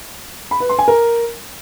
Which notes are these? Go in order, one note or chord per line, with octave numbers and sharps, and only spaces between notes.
B5
B4
C6
G#5
A#4